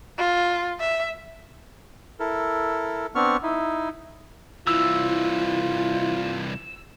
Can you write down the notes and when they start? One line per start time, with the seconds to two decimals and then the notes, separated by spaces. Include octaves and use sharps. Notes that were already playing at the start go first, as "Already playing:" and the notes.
0.18 F4
0.80 E5
2.20 E4 A4 A#4
3.15 B3 C4 D4 C#6 F6
3.43 D#4 E4
4.67 C2 E3 E4 F4 E6